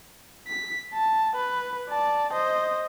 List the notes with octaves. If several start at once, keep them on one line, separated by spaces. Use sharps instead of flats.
B6
A5
B4
D5 A5
C5 D#5